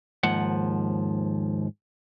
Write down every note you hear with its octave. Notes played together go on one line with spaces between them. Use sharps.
D#2 G#2 F3 F#5